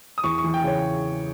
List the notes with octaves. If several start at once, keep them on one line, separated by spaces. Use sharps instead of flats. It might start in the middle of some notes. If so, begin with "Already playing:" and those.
D#6
E2 C#6
C#6
E3
G5
C#3 C#5